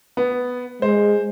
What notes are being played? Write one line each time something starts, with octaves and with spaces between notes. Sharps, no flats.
B3
G#3 C5